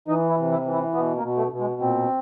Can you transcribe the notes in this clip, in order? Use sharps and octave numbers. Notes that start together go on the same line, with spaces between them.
E3 D#4
E4
C3
E4
E3
E4
B2 B3
A#3
B2
A3
B2
G#3
A#2 C4